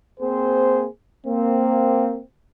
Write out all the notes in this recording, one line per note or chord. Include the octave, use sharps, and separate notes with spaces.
A#3 C4 G#4 C5
A#3 C4